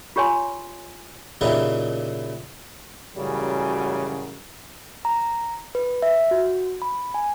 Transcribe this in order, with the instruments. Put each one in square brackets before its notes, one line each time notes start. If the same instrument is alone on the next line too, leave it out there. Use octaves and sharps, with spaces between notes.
[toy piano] F4 G4 C#5 G#5 C6
[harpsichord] A#2 C#3 E3 D#4 E4 G4
[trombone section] A1 F#2 C#3 F#3 G3
[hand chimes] A#5
B4
E5
F#4
B5
G#5